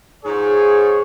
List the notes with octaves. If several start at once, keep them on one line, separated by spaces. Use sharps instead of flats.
F2 G#2 G#4 C#5